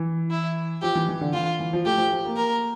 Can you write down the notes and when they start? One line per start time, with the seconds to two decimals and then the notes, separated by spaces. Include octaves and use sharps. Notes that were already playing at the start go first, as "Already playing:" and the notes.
Already playing: E3
0.31 E4
0.82 F3 G4
0.95 E3
1.09 E3
1.21 D3
1.33 E3 F4
1.60 E3
1.73 F3
1.86 A3 G4
1.98 F3
2.12 F3
2.25 A#3
2.37 A#4